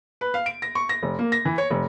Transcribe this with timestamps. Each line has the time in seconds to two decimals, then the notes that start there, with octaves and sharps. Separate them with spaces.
0.21 B4
0.34 F5
0.46 D7
0.62 A#6
0.75 C#6
0.89 A#6
1.03 F1
1.19 A#3
1.32 A#6
1.45 E3
1.58 C#5
1.70 F1